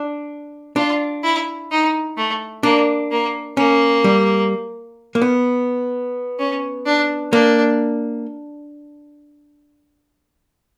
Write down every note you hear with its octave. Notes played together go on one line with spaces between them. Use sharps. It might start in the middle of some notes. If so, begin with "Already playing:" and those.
Already playing: D4
D4 F4
E4
D#4
A3
A#3 D4
A#3
A#3 C#4
G3
A#3
B3
C#4
D4
A#3 D4